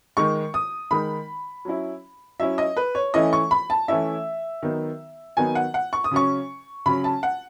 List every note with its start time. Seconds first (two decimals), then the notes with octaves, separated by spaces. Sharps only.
0.17 D#3 G#3 D#4 C#6
0.54 D#6
0.91 D#3 G#3 D#4 B5
1.65 F#3 C#4 E4
2.40 F#3 C#4 E4 E5
2.58 D#5
2.77 B4
2.95 C#5
3.14 E3 A3 C#4 E4 D#5
3.33 C#6
3.51 B5
3.70 A5
3.88 E3 A3 C#4 E4 E5
4.63 D#3 F#3 B3 D#4
5.37 D#3 F#3 B3 D#4 G#5
5.55 F#5
5.74 F#5
5.93 C#6
6.04 D#6
6.11 C#3 F#3 C#4 C#6
6.86 C#3 F#3 C#4 B5
7.04 A5
7.23 F#5